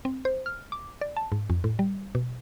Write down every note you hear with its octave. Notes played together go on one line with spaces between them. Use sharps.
C4
C5
F6
D6
D5
A5
G#2
F2
A2
G3
B2